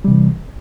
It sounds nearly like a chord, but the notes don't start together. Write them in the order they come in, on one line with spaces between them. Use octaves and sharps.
G3 C3 E3